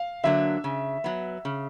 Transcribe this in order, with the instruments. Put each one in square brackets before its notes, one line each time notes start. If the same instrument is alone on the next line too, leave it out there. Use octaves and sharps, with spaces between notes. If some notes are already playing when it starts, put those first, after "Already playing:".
Already playing: [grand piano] F5
[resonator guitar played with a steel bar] D3 F#3 A#3 D4 [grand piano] E5
[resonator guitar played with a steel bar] C#3
F#3 B3
C#3